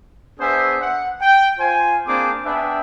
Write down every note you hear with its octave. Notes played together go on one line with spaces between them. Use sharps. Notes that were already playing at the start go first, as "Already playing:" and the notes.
B3 D4 G#4 C5 E5 G#5
F#5
G5
F4 C5 G#5
A#3 C4 D4 G#4 C5 D6
B3 D4 B4 E5 G5 G#5